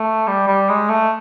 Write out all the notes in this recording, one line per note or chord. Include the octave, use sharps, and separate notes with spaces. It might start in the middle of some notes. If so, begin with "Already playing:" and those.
Already playing: A3
G3
G3
G#3
A3